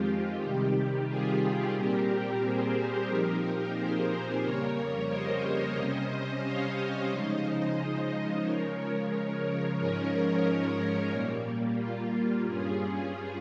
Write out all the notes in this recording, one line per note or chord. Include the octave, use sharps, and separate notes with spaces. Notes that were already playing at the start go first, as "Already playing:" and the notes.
Already playing: F2 D#3 G#3 C4 F4 G4
C3 D#3 G3 G4
F4 G#4
A#2 G3 C4 G4 A#4
G#4 C5
A#2 F3 C4 D#4 G4 A#4
G#4 C5
F2 C#3 G3 A#3 A#4 C#5
C5 D#5
C3 G3 C#4
C#5 F5
C#3 F3 G#3 D#4 C5 D#5
C5 D#5
C#3 F3 G#3 A#4 C#5
G#2 F3 G#3 C#4 A#4 C#5
A#2 G3 A#3
F4
G2 G3 C#4 F4 G#4